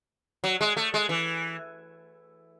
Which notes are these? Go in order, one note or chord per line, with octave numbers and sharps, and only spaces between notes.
F#3
G#3
A3
G#3
E3